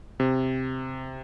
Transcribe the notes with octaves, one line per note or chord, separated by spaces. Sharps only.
C3